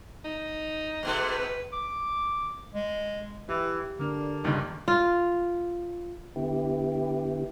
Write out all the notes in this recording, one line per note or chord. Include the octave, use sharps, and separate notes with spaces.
D#4
G#2 B2 A3
B4
D6
G#3
E3 G4
D3 A#3 D4
F#1 C#2 G2 D#3 D#4
F4
D3 B3 E4 G4